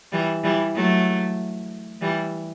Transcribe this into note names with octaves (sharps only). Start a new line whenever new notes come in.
E3 G3
E3 G3
F#3 A3
E3 G3